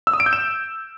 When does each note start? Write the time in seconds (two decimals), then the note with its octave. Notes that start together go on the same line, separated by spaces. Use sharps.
0.07 E6
0.13 D#6
0.20 D7
0.26 G6
0.33 E7